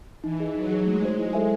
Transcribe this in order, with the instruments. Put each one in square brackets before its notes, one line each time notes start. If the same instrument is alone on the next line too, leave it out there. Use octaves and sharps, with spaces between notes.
[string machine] E3 [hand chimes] D#4
[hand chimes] G#4 D#5
[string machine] F#3 [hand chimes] D#4
[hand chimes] G#4 C#5
[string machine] G#3 [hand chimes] A3
[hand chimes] D#4 F#4 C5
[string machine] G#3 [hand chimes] E4
[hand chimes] A4 C5 E5 G#5